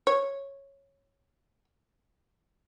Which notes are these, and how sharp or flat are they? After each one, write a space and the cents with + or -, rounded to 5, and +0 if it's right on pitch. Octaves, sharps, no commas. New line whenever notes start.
C#5 -5